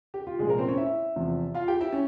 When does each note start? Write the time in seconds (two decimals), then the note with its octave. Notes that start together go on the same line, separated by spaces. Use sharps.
0.14 G4
0.27 F4
0.39 C2 A#2 F3 G#3 G#4
0.49 A#3 A#4
0.58 C4 C5
0.68 C#4 C#5
0.77 E4 E5
1.16 E2 C3 F3
1.55 F4 F5
1.68 G4 G5
1.80 E4 E5
1.93 C#4